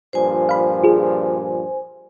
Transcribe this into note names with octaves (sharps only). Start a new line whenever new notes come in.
G2 A#2 F3 C5 G#5
F5 B5
F4 G#4